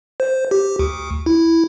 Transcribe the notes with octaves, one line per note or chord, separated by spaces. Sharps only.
C5
G4
D2
E4